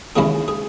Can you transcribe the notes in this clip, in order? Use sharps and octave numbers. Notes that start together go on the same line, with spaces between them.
D#2 C#3 G#3 C#4 E4 G#4
G#4